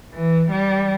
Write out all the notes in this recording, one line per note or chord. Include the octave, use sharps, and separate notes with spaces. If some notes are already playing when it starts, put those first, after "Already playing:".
E3
G3